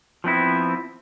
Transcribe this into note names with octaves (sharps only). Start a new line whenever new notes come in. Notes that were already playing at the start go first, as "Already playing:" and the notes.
F3 B3 C4 E4